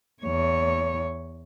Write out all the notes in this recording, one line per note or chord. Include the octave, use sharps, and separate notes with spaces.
E2 C#5